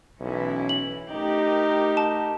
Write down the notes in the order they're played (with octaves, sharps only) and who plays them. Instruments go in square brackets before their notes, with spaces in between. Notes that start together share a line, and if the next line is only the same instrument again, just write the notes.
[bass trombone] B1 [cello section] E3 C#4 E4
[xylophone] F#7
[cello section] A3 G4 A#4 [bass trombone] D#4
[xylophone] A5